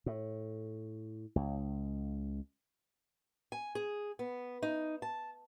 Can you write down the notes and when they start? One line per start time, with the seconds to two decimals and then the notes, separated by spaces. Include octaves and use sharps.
0.06 A2
1.36 C#2
3.52 G#5
3.75 G#4
4.19 B3
4.63 D#4
5.02 A5